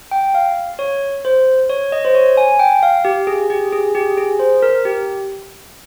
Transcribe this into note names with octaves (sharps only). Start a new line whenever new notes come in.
G5
F5
C#5
C5
C#5
D#5
C5
C#5
G#5
G5
F5
G4
G#4
G4
G#4
G4
G#4
C5
A#4
G4